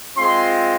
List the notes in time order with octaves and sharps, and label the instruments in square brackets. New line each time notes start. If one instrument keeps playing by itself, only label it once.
[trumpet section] G#3 C4 F4 C6